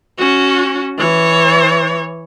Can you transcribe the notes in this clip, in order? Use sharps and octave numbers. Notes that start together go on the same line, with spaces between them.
C#4 F#4
E3 C#5